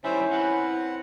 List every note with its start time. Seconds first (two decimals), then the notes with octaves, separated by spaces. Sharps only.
0.04 D#3 G3 C#4 E4 C5 E5
0.31 C4 B4 F#5